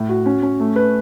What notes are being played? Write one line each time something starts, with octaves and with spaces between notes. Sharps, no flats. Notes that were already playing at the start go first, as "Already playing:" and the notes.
Already playing: A2
F#4
C#4
C#4
A3
B4